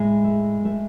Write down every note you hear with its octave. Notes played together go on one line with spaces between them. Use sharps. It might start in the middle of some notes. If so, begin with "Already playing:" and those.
Already playing: A2 G#3 G#4
A3
A3